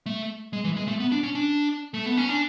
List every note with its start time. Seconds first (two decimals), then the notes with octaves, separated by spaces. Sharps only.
0.06 A3
0.53 G#3
0.64 E3
0.77 G#3
0.88 A3
1.00 B3
1.12 D4
1.23 C#4
1.35 D4
1.94 A3
2.06 B3
2.17 C#4
2.29 D4